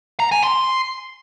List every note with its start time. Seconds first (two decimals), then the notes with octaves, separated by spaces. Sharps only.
0.20 A#5
0.32 G#5
0.43 C6